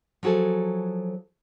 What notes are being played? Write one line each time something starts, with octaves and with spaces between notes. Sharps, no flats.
F3 F#3 F#4 G#4 A4